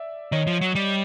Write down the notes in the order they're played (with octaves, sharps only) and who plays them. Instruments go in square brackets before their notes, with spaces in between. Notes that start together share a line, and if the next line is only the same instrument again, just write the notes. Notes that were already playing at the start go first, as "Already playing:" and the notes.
Already playing: [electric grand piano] D5 E5
[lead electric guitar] D#3 [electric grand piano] C#5 D#5
[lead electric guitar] F3
F#3
G3